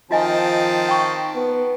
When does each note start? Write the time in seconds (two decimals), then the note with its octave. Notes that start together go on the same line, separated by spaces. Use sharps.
0.11 D#3 F3 C4 F4 D#5 G#5 A5
0.89 G5 C#6
1.36 B3